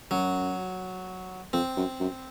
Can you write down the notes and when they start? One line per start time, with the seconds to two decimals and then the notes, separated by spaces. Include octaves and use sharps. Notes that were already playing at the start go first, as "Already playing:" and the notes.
0.11 F#2 F#3
1.53 F2 C4
1.77 F#2
2.00 F#2